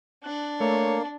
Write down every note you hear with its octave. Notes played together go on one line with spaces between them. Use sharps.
D4 F#6
A3 A#3 C#5